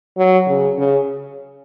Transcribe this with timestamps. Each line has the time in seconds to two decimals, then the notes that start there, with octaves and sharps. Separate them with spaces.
0.17 F#3
0.47 C#3
0.78 C#3